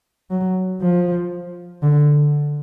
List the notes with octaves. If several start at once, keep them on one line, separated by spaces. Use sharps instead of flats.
F#3
F3
D3